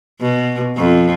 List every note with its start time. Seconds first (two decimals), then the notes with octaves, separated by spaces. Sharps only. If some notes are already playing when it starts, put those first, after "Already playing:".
0.21 B2
0.77 F2